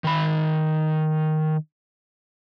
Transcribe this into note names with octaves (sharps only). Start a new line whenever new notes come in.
D#3 B5